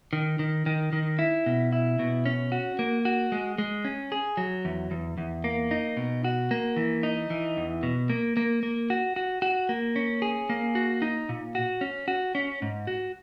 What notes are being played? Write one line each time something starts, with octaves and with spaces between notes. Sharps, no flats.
D#3
D#3
D#3
D#3
E4
B2
E4
B2
C#4
F#4
A#3
F#4
G#3
G#3
C#4
G#4
F#3
E2
E2
E2
A#3
D#4
B2
F#4
A#3
E3
D#4
E3
E2
B2
A#3
A#3
A#3
F#4
F#4
F#4
A#3
C#4
G#4
A#3
F#4
D#4
A#2
F#4
C#4
F#4
C#4
G#2
F#4